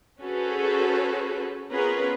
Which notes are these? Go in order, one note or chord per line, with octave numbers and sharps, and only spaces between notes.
C#4 F#4 G#4 A4 B4 C5
B3 C#4 F4 G#4 A#4 B4